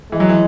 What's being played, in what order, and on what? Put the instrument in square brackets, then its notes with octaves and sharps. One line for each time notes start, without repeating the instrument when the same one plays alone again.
[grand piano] E3 [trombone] G#3
[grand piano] F#3
E3